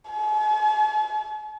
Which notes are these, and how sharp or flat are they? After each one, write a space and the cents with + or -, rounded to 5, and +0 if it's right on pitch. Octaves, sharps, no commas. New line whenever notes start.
G#5 +45